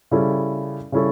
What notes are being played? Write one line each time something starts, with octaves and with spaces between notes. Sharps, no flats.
C#3 G3 C#4 E4 A4
C#3 G3 C#4 E4 A4